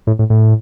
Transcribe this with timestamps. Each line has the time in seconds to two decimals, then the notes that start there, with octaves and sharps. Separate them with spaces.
0.07 A2
0.19 A2
0.30 A2